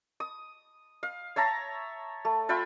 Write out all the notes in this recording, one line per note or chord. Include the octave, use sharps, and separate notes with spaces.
D#6
F5
C#5 E5 A5 A#5
A3
F4 E5 G5 B5